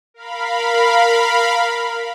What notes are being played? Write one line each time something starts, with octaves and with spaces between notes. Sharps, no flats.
A#4 F5 B5